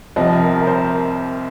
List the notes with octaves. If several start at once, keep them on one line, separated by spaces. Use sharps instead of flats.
C2 C3 F3 D#5
A#4
A#4
C5